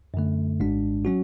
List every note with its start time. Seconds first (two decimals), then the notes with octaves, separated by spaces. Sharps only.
0.14 F#2 D3 A3
0.60 G#1 G#2 G#3 D4
1.05 F#3 C#4 F#4